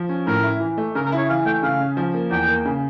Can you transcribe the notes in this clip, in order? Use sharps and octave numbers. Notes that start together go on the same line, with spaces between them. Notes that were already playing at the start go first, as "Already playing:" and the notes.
Already playing: F3
C#4
A2 A#4
E4
E3
A3
C#3 A#4
A#4
E4 C#5
E3 F5
A3 G5
C#3 F5
C#4
F3
A#3
E2 G5
A#3
C#3